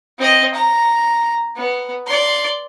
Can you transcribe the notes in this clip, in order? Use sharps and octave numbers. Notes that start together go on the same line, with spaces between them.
C4 D#5
A#5
B3
D5 C6